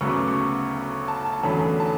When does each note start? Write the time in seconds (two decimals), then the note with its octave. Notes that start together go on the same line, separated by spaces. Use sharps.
0.01 D2 C#3 F#3 B3 C#6
0.10 D6
0.28 C#6
1.08 A5
1.26 A5
1.44 E2 D3 F#3 A3 C#4 B5
1.80 A5